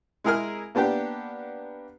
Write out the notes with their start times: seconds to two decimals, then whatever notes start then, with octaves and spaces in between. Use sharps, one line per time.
0.24 G#3 E4 G#4 A#4 G#5 F6
0.75 A#3 B3 D4 G4 G5